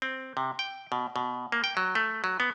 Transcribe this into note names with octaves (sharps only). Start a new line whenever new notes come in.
C4
C3
G5
B2
B2
A#3
G5
F#3
A3
F#3
B3